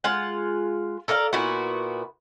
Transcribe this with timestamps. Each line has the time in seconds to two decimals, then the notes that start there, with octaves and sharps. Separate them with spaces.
0.04 G#3 F4 F#5
1.08 A4 A#4 D5 F5
1.33 A#2 B3 E4 F#4